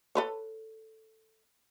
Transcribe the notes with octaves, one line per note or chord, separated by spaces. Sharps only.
A4 B4 C#5